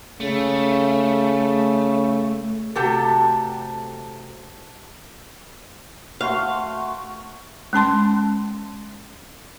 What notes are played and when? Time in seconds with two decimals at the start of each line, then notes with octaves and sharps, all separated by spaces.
0.20 C#3 A3
2.75 C3 A3 F#4 G4 A4
6.21 A3 F#4 F5 C6
7.73 G#3 C#4 A5 C6